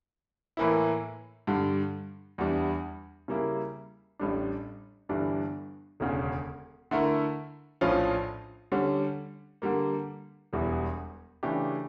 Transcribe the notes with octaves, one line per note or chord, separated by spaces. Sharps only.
A2 E3 A#3 E4
G2 D3 G3
E2 E3 G3 D4
C#3 G3 A#3 E4
A1 A2 G3 D4
G1 G2 E3 G3 D4
E1 D2 C#3
D3 A3 E4 A#4
A#1 A2 F3 C#4 F4
D3 G3 C#4
D3 G3 A#3
E1 E2 E3 G3
C#3 E3 A3 D4 G4